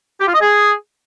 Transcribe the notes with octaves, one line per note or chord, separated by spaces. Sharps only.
G4
F4
D#5
G#4